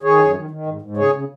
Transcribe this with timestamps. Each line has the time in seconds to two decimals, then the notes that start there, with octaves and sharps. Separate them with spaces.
0.03 D#3 G#4 C#5
0.19 F#2
0.35 D#3
0.51 D#3
0.66 G#2
0.82 G#2
0.97 C#3 G#4 C#5
1.13 C#3